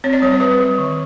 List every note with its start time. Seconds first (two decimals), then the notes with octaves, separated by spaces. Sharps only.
0.04 C4 C#5
0.13 D5
0.22 G3 C#5
0.32 C5
0.40 G3 B4
0.60 G3
0.78 D#3